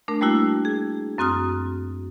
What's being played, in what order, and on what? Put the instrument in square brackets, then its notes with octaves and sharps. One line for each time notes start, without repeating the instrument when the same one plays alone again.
[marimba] A3 D4 A#4
G3 A3 A#3 E4 F#4
G#4
F#2 C4 F#4 D#6 F6